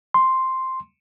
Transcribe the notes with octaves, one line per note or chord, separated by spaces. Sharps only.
C6